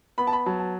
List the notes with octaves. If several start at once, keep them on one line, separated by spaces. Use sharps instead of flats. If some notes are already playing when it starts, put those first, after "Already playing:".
B3 B5
A5
B5
F#3 A5
A5